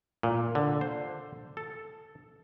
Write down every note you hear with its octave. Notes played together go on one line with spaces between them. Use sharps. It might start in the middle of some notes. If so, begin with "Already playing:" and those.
A#2
D3
C5
A4